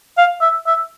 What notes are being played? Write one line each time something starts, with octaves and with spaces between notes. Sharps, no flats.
F5
E5
E5